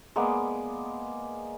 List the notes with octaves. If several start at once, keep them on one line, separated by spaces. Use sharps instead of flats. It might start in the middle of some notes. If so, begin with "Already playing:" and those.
G#3 A#3 B3 D5